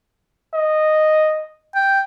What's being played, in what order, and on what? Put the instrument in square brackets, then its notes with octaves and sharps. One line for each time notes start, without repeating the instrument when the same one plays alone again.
[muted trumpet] D#5
[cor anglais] G5